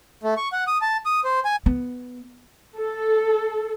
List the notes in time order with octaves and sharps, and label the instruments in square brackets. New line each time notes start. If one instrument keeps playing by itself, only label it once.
[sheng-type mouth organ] A3
C#6
F#5
D#6
A5
D#6
C5
G#5
[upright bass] B3
[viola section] A4